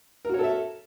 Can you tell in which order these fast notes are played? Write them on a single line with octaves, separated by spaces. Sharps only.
A#4 F#4 C#5 A4 E5